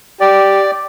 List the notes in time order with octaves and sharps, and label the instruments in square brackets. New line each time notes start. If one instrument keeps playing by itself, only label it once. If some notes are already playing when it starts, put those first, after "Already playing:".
[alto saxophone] G4 [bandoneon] D5